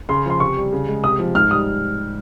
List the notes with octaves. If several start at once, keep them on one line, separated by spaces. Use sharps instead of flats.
C#3 C6
F3 C6
C3 C#6
G3
C#3
G#3
C3 D#6
F3
G#2 F6
G3 D#6